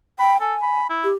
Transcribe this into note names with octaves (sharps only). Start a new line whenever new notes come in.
G5 B5
A4 G#5
B5
E4
G4